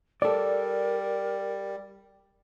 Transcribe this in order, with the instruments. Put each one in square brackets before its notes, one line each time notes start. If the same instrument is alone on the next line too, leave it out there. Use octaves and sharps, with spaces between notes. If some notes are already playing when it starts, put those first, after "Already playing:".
[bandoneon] G3 [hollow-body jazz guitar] A4 D5 [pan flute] A#4